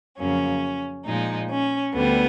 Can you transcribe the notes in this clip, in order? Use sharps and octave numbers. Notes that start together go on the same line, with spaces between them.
F2 C#3 F#3 A#3 C#4
A#2 F3 G#3 D#4
C#4
D2 D3 G3 B3